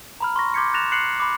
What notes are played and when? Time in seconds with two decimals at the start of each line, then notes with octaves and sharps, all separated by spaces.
0.20 A#5 B5 F6
0.36 C6 C#6 A#6
0.54 C6 D6 G6 G#6 B6 C#7
0.74 F#6 A6 A#6 E7 F7
0.92 F#6 C7 C#7 F#7
1.20 B5 D6